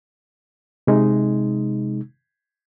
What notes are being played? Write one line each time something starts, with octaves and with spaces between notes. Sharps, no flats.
C3 G#3 D#4